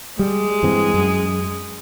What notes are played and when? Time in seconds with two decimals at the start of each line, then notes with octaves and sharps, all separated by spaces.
0.19 G3 G#3
0.63 G2 E3 C4
0.94 F#2